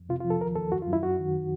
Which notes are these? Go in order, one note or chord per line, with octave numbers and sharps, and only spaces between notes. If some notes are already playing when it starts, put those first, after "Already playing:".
Already playing: F2
C3 F4
F4
F3
A4
D#2 A#4
D#2 A4
F#2 F#4
F4
F#2 E4
F#2 F#4
D#3